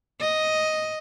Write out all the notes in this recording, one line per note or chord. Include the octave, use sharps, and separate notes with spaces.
D#5